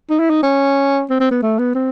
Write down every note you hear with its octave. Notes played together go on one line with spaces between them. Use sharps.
D#4
E4
D#4
C#4
C4
C4
B3
A3
B3
C4